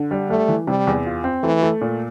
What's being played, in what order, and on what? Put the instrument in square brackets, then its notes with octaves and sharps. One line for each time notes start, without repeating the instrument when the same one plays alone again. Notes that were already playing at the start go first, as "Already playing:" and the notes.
Already playing: [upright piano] D3
G3
[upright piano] G3 [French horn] A3
[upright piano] E3
[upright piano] C3 [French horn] G3
[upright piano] E2
F4
C4
[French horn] E3 [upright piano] A3
[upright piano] A3
A#2